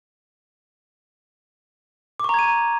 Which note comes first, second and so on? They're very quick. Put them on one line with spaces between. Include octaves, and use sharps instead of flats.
D6 C#6 A#5 G#6 D#7